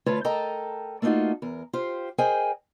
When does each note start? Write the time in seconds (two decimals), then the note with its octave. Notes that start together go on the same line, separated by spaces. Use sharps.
0.06 D2 A3 F4 B4 C#5 A5
0.24 A4 A#4 D#5 G5 A5 A#5
1.02 A3 A#3 D4 D#4 F4 F#4
1.42 E2 A#4
1.73 F4 G4 C5
2.18 G#4 A#4 C5 D#5 G5 G#5